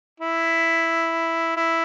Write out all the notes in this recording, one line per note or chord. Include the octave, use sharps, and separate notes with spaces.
E4
E4